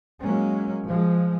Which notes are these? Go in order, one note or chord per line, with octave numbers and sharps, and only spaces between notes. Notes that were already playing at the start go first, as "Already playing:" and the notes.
F#3 G#3 A#3 C#4
F3 G#3